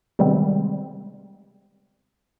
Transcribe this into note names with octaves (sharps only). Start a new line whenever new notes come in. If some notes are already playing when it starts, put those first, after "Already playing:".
C3 D#3 G3 G#3 B3 C4